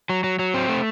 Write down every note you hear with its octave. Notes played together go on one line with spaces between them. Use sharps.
F#3
F#3
F#3
C4
A3